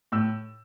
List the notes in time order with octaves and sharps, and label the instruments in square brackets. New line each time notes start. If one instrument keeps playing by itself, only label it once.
[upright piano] A2 E6